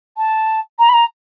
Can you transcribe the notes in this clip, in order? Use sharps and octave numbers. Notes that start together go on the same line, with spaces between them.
A5
A#5
B5
A#5